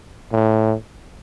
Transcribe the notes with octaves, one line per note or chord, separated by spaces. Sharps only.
A2